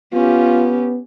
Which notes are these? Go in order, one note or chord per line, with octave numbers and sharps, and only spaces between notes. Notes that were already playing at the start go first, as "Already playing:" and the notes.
B3 C#4 F4 G4